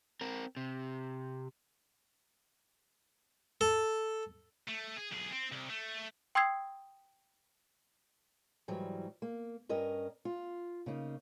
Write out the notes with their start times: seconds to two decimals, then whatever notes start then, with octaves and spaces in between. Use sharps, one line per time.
0.21 C4 A#4
0.57 C3
3.61 A4
4.68 A3
4.97 G#4
5.12 B1 G#4
5.31 C4
5.52 C2
5.70 A3
6.35 G5 C6 D#6 E6 G#6 C7
8.68 G#2 E3 F#3 G3
9.22 A#3
9.69 G2 C#4 A#4 D#5
10.25 F4
10.86 C#3 A#3 D#4